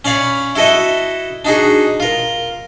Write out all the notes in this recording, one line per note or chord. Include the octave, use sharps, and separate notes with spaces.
C#4 C#5 D5 F5 B5
E4 F#4 A4 D#5 E5
D4 D#4 F#4 G#4
F4 A#4